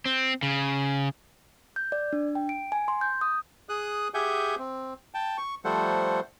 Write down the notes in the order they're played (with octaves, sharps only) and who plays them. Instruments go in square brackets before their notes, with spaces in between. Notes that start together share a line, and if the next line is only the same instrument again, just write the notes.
[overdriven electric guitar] C4
C#3
[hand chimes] G6
D5
D4
G5
D7
G#5
C6
G6
D#6
[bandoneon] G#4 D#6 F#6
G4 G#4 E5 F#5 G#5 G6
C4
G5 A5
C#6
F3 G3 A3 A4 C5 F#5